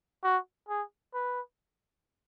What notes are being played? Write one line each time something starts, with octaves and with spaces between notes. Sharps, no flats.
F#4
G#4
B4